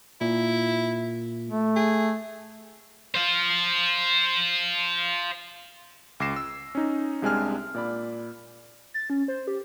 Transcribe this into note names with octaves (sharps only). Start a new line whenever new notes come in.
A#2 E4
A3
G#4
C5 F5
C#2 D6 A#6 C7 E7
E6
C#4 D#4
C2 C3 G#3 D4 G#5 F6
A#2 D5 B5
A6
C#4
C5
G4